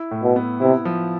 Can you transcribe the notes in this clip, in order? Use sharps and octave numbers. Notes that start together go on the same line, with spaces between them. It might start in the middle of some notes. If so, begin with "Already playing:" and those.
Already playing: E4
A2
B2
B3
C3 E4
F3